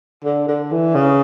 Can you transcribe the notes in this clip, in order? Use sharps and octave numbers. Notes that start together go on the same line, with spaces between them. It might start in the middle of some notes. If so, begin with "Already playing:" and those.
D3
D3
E3
C#3